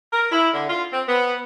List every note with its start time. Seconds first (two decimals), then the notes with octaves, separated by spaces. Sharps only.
0.12 A#4
0.30 E4
0.52 D3
0.68 F4
0.92 C4
1.07 B3